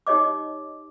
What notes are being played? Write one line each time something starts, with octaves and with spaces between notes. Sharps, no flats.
D#4 G4 C#5 D#5 D6